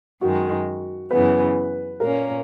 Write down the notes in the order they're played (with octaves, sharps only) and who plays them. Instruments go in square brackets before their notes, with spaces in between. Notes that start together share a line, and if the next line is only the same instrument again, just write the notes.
[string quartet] F#2 D#3 G#3 [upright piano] F#4
[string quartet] F#2 C#3 E3 B3 [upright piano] B4
[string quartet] A#2 A#3 C#4 [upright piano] A#4